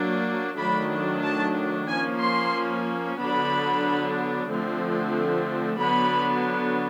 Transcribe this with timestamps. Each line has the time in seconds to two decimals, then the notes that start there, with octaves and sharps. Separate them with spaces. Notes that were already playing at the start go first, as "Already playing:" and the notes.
Already playing: F#3 A#3 D4
0.57 D#3 F#3 A3 D4 B5
1.23 A5
1.87 F3 A#3 C#4 G#5
2.20 C6
3.18 D3 F#3 B3 D4 B5
4.49 D3 F3 A3 C4
5.79 D3 F#3 B3 D4 B5